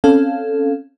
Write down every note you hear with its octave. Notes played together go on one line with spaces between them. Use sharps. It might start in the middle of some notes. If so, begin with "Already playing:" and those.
C4 C#4 A4 F5